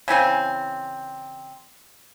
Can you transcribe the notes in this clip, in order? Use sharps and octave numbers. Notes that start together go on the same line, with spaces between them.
C#3 E3 C4 G#5